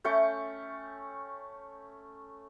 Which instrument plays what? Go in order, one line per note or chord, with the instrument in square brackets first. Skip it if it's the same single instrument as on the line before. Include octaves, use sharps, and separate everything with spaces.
[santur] A3 C#4 G5 C#6